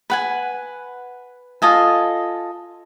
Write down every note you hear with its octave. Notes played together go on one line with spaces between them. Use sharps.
B4 F#5 G#5
F4 A4 D#5 G#5